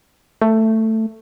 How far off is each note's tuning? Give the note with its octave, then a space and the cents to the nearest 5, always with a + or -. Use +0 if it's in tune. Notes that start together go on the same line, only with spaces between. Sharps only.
A3 +10